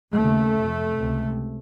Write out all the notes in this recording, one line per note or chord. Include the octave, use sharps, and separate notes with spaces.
D#2 C#3 A3
F2 C3
C#2 C3